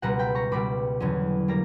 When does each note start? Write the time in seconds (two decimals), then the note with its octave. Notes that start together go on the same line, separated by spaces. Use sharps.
0.02 C#2 B2 G3 B3 F#5 A#5
0.19 G5 B5
0.35 A#5 C#6
0.51 C#2 B2 G3 B5 D6
1.00 E2 D3 F#3 C#4
1.48 G3 A#3 A#5